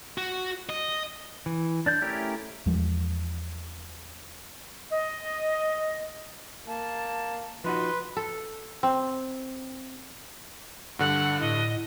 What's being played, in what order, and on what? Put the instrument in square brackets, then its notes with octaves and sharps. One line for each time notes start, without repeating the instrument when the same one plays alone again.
[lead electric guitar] F#4
D#5
[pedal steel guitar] E3
D4 D5 G6
A3 C#4 E4 G4 A#4
[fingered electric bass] E2 F3 G#3
[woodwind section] D#5
[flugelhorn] A#3 [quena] A5
[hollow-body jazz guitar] F3 D#4 F#4 [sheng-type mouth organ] B4 [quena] C6
[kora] A4
C4
[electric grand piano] G2 D3 [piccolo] F#5
[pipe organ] A2 [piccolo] D#5